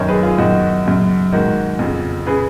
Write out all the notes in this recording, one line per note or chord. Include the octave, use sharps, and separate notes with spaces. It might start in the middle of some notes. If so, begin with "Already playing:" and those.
Already playing: F#2 D#3 A#4 C#5
G#4 B4
F4 G#4
F#2 D#3 D#4 F#4
F#2 C#3
G#2 D#3 F#4 A#4
F2 C#3
C#3 G#4 B4